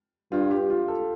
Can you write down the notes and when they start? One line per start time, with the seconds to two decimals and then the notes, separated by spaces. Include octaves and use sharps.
0.31 G2 F4
0.51 G4
0.70 F4
0.88 A4